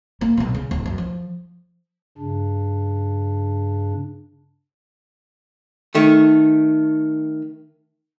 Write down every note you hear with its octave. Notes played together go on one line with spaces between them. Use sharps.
A#3
B1 B2
C#3
D1
F#2
F3
G2 C#3 D4
D#3 A3